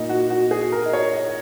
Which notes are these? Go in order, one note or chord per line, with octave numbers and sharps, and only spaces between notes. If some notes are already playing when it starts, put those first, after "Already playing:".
Already playing: A#2 A#3 D#4
F#4
F#4
G#4
A#4
D#5
C#5
D#5